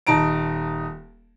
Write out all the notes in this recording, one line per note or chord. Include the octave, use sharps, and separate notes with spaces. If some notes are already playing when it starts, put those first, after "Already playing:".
D#1 D#4 A5 A#5 D7